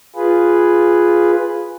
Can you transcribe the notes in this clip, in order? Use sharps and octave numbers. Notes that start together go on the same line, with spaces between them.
F4 G#4 B4